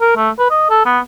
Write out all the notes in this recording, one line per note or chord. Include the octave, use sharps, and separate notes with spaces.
A#4
A3
B4
D#5
A4
B3